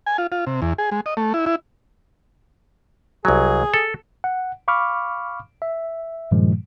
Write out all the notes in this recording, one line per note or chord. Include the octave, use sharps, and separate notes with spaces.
G#5
F4
F4
C3
E2
G#4
G#3
D#5
A3
E4
E4
C2 F#3 G#4
A4
F#5
F5 B5 C#6 D6 F6
E5
G2 A#2 D#3 F3 G#3